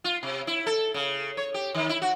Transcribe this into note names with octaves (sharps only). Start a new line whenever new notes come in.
F4
C3
E4
A4
C#3
C#5
G4
D#3
E4
F#4